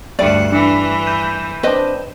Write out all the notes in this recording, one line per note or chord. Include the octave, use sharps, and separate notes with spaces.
D2 G2 G3 A3 D5 F#5 D#7 E7
E3 D4
G6 D#7 E7
C4 D4 B4 D#5